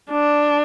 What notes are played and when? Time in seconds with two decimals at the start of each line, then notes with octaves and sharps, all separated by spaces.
0.11 D4